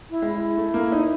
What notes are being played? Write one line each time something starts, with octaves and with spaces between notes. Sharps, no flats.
E4
G#3
E4
A3
A#3
D#4